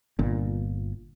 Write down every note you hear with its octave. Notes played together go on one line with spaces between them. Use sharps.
G1 A#2